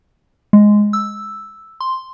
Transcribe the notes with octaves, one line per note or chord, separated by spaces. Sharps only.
G#3
E6
C6